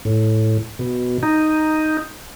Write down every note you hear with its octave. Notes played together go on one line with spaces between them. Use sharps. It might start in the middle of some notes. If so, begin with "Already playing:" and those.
A2
B2
D#4